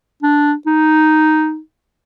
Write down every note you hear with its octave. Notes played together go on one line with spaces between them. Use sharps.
D4
D#4